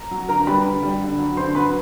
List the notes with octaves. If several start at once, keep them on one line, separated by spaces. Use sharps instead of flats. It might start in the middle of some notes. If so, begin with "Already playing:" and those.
Already playing: A#5
F#3
D3 A#4 A#5
G3 B4 B5
D3
G3
D3
F#3
D3 C5 C6
F#3 B4 B5